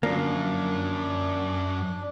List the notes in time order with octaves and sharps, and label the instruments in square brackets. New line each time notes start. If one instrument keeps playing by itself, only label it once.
[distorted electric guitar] F#2 [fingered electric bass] D3 F3 F#3 [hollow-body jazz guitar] A#3 [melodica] D4